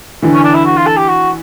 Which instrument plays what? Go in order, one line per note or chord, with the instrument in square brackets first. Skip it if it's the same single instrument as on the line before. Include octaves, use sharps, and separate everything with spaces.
[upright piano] D3 E3
[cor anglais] C#4
D4
E4
F#4
F4
A4
G4
F#4